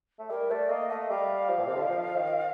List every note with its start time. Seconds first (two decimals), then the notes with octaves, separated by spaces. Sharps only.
0.19 A3
0.30 G3 A#4
0.50 A3 D5
0.70 A#3 D#5
0.89 A3 D#5
1.10 G3 F5
1.49 F3
1.60 A#2
1.67 C3
1.74 D3
1.82 D#3
1.89 F3
2.15 D#3